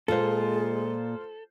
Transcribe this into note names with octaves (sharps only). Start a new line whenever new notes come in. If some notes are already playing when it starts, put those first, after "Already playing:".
A#2 G#3 A#3 F4 A4 C5